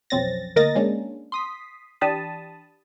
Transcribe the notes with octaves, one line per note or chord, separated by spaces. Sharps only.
B1 F2 C4 C#4 A6 A#6
D2 A#3 A#4 D#5 A6 A#6
G#3 A#3 C#4 D4
C6 D#6 B6
E3 D4 G4 A5 B5 D#6